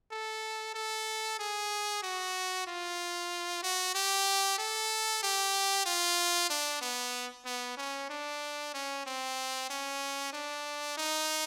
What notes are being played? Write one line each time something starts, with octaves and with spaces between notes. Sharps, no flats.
A4
A4
G#4
F#4
F4
F#4
G4
A4
G4
F4
D4
B3
B3
C#4
D4
C#4
C4
C#4
D4
D#4